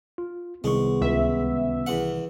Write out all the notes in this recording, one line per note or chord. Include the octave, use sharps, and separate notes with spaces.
F4
C2 D#3 G#3 B3 C#6
C#2 E5
E2 F#5